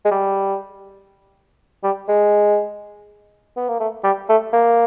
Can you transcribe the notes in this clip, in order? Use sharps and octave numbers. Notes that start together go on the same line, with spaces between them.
G#3
G3
G3
G#3
B3
A#3
A3
G3
A3
A#3